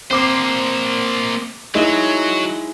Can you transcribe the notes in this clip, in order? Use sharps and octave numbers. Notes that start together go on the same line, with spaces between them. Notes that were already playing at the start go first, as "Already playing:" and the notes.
A#3 C4 C5 D6 C7
F#3 G#3 D#4 E4